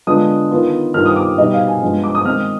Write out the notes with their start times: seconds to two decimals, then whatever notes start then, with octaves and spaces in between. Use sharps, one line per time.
0.07 D3 G#3 B3 D4 F4 D#6
0.51 D#3 B3 F4
0.94 G2 D#3 G3 B3 F4 F6
1.05 D#6
1.16 D6
1.38 B2 G3 B3 D#4 D#5
1.53 F5
1.67 G#5
1.82 G2 F3 G#3 B3 F4
2.04 D6
2.15 D#6
2.25 D#3 G#3 C4 D#4 F6